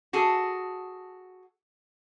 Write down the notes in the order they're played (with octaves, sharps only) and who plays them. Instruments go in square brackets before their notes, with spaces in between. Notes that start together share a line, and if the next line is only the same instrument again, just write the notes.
[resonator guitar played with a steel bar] F#4 G#4 A4